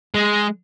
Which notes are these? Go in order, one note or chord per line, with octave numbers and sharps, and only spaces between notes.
G#3